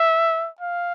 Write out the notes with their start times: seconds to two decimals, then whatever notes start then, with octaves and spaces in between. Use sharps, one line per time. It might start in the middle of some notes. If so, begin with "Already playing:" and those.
Already playing: E5
0.61 F5